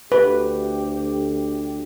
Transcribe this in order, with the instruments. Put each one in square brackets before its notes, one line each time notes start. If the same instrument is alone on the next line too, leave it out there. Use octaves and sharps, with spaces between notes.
[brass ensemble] D2 G4 [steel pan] B4